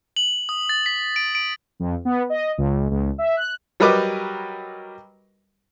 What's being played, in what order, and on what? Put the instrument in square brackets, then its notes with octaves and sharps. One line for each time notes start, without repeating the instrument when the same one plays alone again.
[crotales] F#7
D#6
A6
B6
D7
D7
[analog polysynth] F2
B3
D#5
C#2
C#2
E5
F#6
[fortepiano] F#3 G3 A#4 B4 D#5 D6